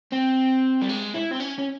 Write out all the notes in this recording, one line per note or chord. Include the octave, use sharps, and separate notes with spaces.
C4
G3
G#3
E4
C4
C#4
C#4